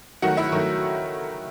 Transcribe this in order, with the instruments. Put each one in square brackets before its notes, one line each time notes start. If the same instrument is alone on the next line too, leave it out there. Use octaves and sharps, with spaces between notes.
[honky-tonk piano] D#3 F#3 A3 F#4 F#5
E4 E5
D#3 F#3 A3